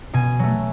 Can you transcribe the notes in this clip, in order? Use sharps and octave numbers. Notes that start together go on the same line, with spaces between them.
B2 G#5
F#3 A3